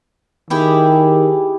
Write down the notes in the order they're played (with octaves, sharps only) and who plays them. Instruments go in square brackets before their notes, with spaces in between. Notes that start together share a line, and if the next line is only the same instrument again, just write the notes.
[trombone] D#3 [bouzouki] E4 G4 G#4